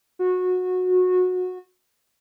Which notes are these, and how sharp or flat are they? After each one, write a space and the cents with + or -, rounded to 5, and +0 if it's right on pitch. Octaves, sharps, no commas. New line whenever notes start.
F#4 -20